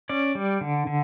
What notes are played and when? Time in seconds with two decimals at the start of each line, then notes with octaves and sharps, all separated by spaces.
0.09 C#4 D5
0.35 G3
0.61 D3
0.87 D3